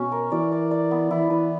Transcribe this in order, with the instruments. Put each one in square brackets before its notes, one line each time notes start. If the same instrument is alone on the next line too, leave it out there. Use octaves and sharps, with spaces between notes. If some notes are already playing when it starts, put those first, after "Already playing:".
Already playing: [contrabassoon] B2 [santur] C#4
[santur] A#4
[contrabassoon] E3 [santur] D5
[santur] D5
D5
B3
[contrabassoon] E3 [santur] E4
[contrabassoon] E3 [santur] B4